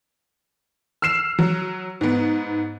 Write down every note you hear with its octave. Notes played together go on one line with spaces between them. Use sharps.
E6 F6 C7 E7
F#3
G#2 B3